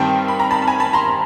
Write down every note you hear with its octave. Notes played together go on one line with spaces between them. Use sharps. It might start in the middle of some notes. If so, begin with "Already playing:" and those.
Already playing: G2 D#3 G3 C4 G5 A5
B5
A#5
A5 B5
A5
G#5 A#5
A5 B5
A#5 C6